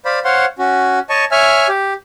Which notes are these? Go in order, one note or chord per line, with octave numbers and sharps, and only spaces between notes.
C5 D5 F5 B5
C5 C#5 F5 F#5 C6
C#4 F#4
C#5 D#5 A5 C#6
C#5 E5 G#5 F6
G4